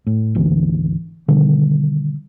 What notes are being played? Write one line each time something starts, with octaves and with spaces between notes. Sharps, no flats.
A2
G#1 D2 D3 E3
B2 D3 D#3 G3